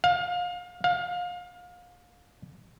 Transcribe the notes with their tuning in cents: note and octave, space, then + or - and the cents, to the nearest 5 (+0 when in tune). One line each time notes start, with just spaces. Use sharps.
F5 +30
F5 +30